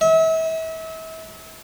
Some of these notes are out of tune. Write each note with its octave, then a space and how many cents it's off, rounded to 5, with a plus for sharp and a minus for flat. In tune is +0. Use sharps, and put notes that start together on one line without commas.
E5 -35